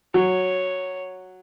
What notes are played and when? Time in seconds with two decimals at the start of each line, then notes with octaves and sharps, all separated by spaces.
0.14 F#3 C#5